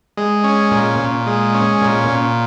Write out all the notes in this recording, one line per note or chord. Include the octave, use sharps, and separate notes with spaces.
G#3
C#4
A#2
A#2
G#3
C#4
A#2
A#2